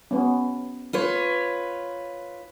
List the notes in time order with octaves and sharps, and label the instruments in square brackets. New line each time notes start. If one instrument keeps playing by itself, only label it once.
[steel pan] B3 C#4
[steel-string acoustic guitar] F4 B4 C#5